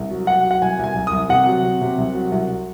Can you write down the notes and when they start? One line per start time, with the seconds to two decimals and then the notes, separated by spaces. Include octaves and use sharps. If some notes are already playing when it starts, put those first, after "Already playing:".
Already playing: C2
0.11 F#3
0.27 F#3 F#5
0.44 F#3
0.51 F#5
0.62 C2 G#5
0.79 C2 G#5
0.95 C2
1.07 D#6
1.13 C2
1.29 C3 F#5
1.47 F#3
1.63 C3
1.81 C3
1.98 C2
2.15 F#3
2.32 C2